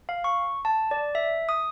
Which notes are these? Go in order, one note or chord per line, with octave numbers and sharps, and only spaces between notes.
F5
C#6
A5
D5
E5
D#6